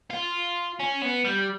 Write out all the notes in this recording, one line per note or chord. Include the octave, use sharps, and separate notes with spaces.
F4
C#4
B3
G3